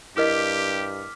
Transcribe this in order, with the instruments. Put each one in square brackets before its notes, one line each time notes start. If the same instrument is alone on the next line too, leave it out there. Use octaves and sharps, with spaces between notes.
[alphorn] G2 [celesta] E4 A#4 D#5 [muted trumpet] G4 [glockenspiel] D6 F6 B6